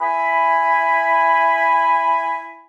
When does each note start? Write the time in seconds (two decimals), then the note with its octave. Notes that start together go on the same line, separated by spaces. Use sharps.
0.01 E4 G#5 B5